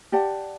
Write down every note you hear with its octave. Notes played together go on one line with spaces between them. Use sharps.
G4 D5 F#5 A5